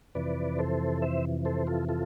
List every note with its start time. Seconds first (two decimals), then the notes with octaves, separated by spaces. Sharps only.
0.15 F2 C3 E3 B4 D5
0.59 A4 C5
1.02 C5 E5
1.45 A4 C5
1.67 F4 A4
1.89 F4 A4